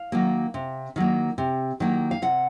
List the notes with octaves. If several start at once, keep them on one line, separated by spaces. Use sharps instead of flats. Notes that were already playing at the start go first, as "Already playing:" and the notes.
Already playing: F5
D#3 F#3 A#3
C3
D#3 F#3 A#3
C3
D#3 F#3 A#3
F5
C3 F#5